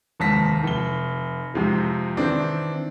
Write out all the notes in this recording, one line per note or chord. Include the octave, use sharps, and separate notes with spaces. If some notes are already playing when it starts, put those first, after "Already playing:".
F1 D#2 G#2 A5 A#6 B6
F1 G7
F2 G#2 C3 F3
D#3 E3 C4 D4